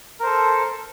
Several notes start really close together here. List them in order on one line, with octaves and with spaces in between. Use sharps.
A#4 C5 A4